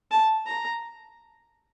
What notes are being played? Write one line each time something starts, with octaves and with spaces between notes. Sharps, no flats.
A5
A#5